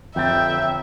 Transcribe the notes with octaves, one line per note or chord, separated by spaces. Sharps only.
G1 F2 E5 G5 A6